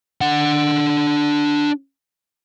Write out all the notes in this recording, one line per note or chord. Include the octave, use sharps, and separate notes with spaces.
D4 F#5